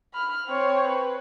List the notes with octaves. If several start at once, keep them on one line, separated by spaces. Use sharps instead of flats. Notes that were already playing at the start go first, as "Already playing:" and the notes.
B5 F6
C4 C#5
B4